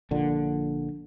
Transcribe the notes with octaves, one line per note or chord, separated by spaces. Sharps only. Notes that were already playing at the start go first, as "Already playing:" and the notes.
A#1 A#2 D3